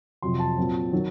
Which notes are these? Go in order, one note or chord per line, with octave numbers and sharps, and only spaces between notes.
F2 C3 F#3 C6
A5
A#2 F#3 C4
D#3 F#3